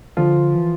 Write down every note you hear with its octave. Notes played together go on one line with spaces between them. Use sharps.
D3 F3 F4
E3